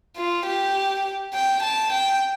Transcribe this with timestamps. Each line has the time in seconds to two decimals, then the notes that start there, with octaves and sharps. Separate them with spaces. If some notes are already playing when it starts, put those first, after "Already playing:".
0.17 F4
0.46 G4
1.34 G5
1.63 A5
1.92 G5